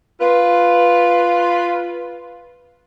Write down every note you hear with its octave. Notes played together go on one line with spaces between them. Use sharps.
F4 B4